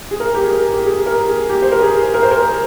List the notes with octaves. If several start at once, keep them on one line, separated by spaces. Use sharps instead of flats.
G#4
A#4
G4
G#4
A#4
G4
G#4
A#4
G#4
G4
C5
A#4
G#4
A#4
C5
A#4